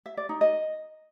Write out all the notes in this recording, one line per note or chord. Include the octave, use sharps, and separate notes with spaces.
E5
D5
D#4
D#5